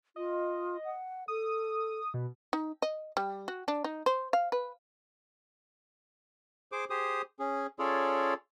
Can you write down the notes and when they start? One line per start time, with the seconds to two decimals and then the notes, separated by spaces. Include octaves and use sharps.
0.16 F4 D#5
0.84 F#5
1.28 A4 D#6
2.14 B2
2.53 D#4
2.82 D#5
3.17 G3
3.48 F#4
3.68 D4
3.84 D#4
4.06 C5
4.33 F5
4.52 B4
6.72 G#4 C5 D6
6.90 G4 G#4 C5 D#6
7.39 C#4 G#4
7.79 C#4 F4 G#4 A4 C#5 D5